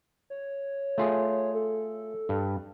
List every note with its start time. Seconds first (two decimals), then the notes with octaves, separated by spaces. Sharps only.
0.30 C#5
0.98 A3 F4 G#4
1.55 A4
2.29 G2